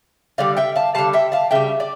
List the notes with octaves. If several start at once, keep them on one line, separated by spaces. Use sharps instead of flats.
D3 G3 D5 F5
E5 G5
F5 A5
D3 G3 F5 A5
E5 G5
F5 A5
C#3 G3 E5 G5
D5